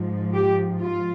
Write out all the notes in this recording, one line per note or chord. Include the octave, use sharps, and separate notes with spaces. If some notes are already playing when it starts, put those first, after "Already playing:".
Already playing: G#2 F3
G4
F4